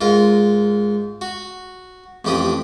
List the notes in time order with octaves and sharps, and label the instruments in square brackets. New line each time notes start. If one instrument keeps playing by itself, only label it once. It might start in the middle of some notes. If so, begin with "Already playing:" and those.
[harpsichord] G#2 F4 A#4
F#4
A1 F2 G4 B5 D#6